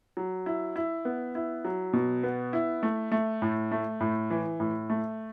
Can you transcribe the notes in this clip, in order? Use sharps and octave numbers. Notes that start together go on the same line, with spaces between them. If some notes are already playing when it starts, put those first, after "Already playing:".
F#3
E4
E4
B3
E4
F#3
B2
B3
E4
A3
A3
A2
A3
A2
E3
A2
A3